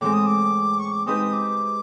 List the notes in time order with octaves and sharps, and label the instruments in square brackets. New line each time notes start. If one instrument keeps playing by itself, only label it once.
[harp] A2 E3 G#3 C4 [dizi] D6
[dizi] D#6
D6
C#6
D6
[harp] G#3 C4 D#4 G4 B4 [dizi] D#6
[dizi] D6